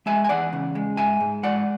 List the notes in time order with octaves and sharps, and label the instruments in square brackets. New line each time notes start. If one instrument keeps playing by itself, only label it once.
[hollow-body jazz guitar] G#3 E5 G#5
G#5
E2 D5 F#5
C#3
G#3
G#2 E5 G#5
G#2
G#3 D5 F#5